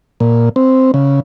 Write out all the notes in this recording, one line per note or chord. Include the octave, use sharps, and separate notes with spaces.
A#2
C4
C#3